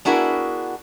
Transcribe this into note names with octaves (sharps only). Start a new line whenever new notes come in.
B3 D4 E4 F#4 G#4 A#4